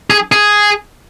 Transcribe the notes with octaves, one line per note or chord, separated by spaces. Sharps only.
G#4
G#4